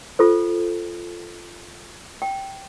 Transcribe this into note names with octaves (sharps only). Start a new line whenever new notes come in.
F4 A4 C5
G5